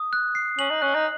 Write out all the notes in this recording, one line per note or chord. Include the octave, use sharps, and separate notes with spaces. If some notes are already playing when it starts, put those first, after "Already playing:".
Already playing: D#6
F#6
C7
C#4 F#7
D#4
C#4 F#6
D#4